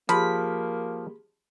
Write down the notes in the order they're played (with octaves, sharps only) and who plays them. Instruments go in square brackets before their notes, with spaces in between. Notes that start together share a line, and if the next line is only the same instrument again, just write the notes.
[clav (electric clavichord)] F3 [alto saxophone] A#3 [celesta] G4 G#4 B6 [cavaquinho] B5